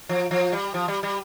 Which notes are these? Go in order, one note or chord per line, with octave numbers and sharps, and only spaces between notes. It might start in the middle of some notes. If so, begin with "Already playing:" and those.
F3
F3
G3
F3
G3
G3